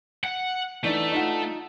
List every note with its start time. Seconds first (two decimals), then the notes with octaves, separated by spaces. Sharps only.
0.24 F#5
0.84 E3 A3 D4 D#4
1.12 D#4 F4 F#5